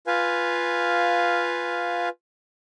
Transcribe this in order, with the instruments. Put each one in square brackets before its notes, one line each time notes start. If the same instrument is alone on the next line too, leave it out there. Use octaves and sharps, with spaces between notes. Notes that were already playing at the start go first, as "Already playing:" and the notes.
[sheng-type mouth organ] F4 B4 F5 G#5